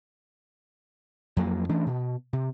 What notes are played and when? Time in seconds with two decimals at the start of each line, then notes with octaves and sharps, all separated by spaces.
1.37 F2 F#3 A#3
1.69 E3 A3 C#4 D4
1.86 B2
2.33 C3